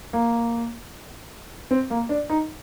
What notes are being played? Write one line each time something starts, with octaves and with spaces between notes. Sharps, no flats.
A#3
C4
A#3
D4
D#4